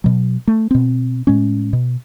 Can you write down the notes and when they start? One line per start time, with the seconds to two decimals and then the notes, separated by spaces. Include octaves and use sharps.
0.04 B2 F#3
0.47 A3
0.71 B2 C4
1.27 A2 G#3 C#4
1.73 B2